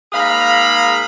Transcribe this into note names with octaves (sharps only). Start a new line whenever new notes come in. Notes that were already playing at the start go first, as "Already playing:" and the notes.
G#2 A#3 G#4 F5 A#5 B5